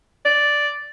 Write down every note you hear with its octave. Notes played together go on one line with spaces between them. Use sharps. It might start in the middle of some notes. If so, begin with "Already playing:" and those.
D5